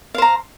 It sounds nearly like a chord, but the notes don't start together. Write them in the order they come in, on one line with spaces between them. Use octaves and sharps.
F5 C5 A#5